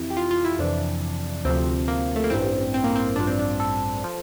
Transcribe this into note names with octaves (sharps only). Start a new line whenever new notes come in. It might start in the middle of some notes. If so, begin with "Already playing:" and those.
Already playing: F2 C3 E3 E4
G4
F4
F4
E4
F2 C3 E3 D4
D2 C3 F3 C4
A#3
A3
A#3
A1 G2 E3 C4
C4
A#3
C4
A1 G2 F3 D4
C4
D4
A4
F3